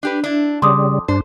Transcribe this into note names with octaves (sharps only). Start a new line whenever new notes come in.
D4 G4 B4
D4 E4
F2 C#3 G3 C6 D6 D#6
G2 D4 C5